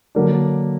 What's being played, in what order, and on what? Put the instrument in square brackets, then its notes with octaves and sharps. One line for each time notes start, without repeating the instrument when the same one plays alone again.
[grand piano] D3 F#3 A#3 D4